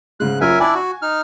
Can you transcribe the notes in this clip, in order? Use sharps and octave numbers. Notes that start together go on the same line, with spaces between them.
G#2 C#3 G#3 F#6
F#1 C#4 F4 A#4 E5 G#5
D4 E4 D5 G#5
F#4
D#4 F6